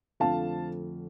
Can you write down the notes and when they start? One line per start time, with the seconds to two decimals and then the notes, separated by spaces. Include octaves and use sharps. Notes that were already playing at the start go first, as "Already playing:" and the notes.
0.20 F2 D3 F3 A3 F5 A5